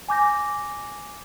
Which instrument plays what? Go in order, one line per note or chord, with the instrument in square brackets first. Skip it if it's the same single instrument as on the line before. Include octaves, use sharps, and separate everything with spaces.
[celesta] G#5 D6 G6 A#6